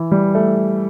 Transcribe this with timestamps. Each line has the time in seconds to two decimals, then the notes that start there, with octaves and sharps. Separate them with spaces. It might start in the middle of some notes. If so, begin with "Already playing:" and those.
Already playing: E3
0.12 G3
0.35 A3